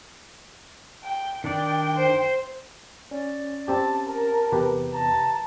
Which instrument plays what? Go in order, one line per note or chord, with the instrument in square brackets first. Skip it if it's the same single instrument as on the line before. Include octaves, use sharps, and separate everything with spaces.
[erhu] G5
[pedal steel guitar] D#3 D4 D5 [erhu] G5
[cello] C5
[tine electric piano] C#4 [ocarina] D5
[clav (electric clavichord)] C4 G4 [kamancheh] A5
[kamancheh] A#4 [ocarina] A5
[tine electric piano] E2 C3 [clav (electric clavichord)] G4 B4
[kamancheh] A5 [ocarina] A#5